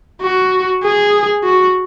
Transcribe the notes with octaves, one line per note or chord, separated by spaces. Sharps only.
F#4
G#4
F#4